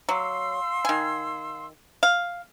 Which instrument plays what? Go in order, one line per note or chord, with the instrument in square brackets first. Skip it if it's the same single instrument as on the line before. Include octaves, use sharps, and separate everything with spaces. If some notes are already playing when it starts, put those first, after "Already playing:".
[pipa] F#3 [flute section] F5 C6 E6
[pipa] D#3 G#5
F5